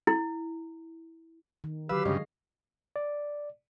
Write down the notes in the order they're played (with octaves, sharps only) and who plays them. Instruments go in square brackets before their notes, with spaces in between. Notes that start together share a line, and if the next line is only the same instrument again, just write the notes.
[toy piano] E4
[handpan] D#3
[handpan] D3 F#3 F5 [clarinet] G4 [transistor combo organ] B4 E6
[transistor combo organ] G2 C#3 [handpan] G#3 C#5 D#5
[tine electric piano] D5